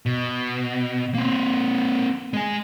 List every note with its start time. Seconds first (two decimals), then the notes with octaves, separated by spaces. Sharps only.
0.06 B2
1.14 A#3 C4
2.34 G#3 G#5